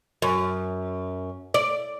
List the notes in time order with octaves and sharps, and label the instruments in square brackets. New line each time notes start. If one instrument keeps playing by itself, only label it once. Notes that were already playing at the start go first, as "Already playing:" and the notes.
[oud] F#2
D5